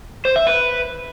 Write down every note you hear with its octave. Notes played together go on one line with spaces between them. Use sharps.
C5
E5
B4